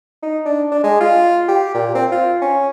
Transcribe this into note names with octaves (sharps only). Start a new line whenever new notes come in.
D#4
D4
D4
G#3
F4
G4
A#2
C4
F4
C#4